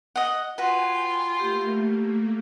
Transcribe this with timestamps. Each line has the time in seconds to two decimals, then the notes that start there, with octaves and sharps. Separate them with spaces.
0.16 D#5 F#5
0.58 F4 F#4 B4 G5 G#5
1.40 A3 A#3 G4